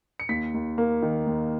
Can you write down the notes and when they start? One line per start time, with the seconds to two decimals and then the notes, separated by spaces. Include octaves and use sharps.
0.20 C#7
0.29 D#2 B6
0.54 D#2
0.78 A#3
1.02 D#3
1.27 D#2